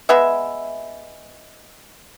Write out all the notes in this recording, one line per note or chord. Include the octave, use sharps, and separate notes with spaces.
G#3 B3 E5